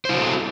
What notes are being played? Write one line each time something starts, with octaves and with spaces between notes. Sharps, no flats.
E4 F#4 A4 C5